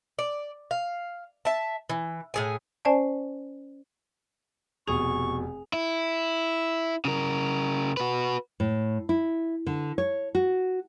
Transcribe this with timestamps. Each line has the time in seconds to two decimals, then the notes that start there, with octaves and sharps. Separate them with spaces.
0.19 D5
0.71 F5
1.45 E5 A5
1.89 E3
2.34 A2 G#4 G#5
2.85 C#4 C5 D5 G#5 A5
4.87 F1 B2 G#4 C#6 F7
5.73 E4
7.05 C#3 A#4
7.97 F#4 B4
8.60 A2
9.09 E4
9.67 D3
9.98 C#5
10.35 F#4